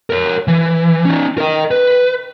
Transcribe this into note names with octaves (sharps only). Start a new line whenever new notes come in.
A#4 C#5
E3
C#4 D#4
A#4 D#5
B4